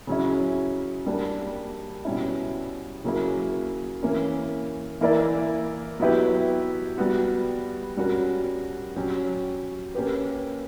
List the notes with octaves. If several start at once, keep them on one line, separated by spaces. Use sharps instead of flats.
C#3 F#3 C#4 E4
G3 A#3 D4
B2 G3 C#4 E4
C#3 F#3 A#3 E4
E3 A#3 C#4
E3 A#3 E4 A#4 D5
F#3 B3 E4 G4 B4
G3 B3 F#4
G3 C#4 F#4 A#4
F#3 C#4 G4
A#3 C#4 G4 B4